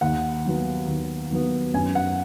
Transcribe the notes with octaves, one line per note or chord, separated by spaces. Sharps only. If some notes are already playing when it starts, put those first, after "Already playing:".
D#2 F#5
D#3 F#3 B3
D#2
D#3 F#3 B3
F#2 G#5
F#5